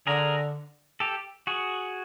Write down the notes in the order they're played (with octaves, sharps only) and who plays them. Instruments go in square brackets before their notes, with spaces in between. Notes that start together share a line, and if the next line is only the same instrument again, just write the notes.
[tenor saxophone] D3 [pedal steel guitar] G#4 A#4
[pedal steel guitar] G4 A4
F#4 G#4